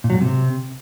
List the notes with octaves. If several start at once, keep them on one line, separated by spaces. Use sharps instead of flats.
A#2
F#3
G#2
C3